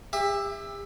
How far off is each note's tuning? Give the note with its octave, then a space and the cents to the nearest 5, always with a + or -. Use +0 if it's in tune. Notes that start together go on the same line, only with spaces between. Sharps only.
G4 +40 E5 +0